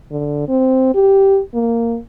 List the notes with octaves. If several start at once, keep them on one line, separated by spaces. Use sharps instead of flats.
D3
C4
G4
A#3